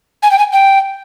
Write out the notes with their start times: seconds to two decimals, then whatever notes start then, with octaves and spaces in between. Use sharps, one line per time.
0.23 G#5
0.31 G5
0.38 G#5
0.52 G5